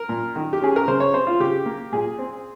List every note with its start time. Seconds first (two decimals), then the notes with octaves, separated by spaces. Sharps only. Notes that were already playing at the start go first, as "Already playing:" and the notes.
Already playing: A#4
0.09 A#2
0.36 D#3
0.53 G4
0.61 C#4 G#4
0.76 A#4
0.88 C#3 C5
1.00 C#5
1.14 C4 C5
1.27 F4
1.40 C#3 G4
1.66 A#3
1.92 A#2 G#4
2.19 C4